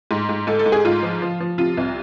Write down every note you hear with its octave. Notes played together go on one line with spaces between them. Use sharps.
G#2
G#2
G#2 A4
A4
G#2
G#4
G#2 F4
F3
F3
F3
C3 F4
C2